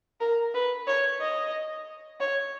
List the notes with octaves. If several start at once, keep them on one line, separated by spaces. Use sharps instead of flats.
A#4
B4
C#5
D#5
C#5